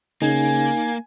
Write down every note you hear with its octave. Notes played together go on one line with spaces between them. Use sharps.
C#3 A#3 D#4 G#5